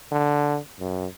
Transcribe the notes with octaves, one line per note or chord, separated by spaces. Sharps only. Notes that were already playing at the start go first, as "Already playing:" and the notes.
D3
F#2